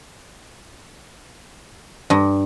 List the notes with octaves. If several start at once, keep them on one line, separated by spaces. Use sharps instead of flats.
G2